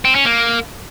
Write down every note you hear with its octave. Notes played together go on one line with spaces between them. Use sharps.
C4
C#4
A#3